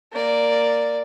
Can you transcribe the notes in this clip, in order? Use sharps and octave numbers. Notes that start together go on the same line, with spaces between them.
A#3 D5